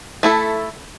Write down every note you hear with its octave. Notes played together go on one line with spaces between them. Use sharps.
A3 E4 A4